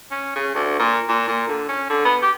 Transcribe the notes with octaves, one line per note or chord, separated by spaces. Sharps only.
C#4
C#3
D2
A#2
A#2
A#2
D3
C#4
D3
B3
G4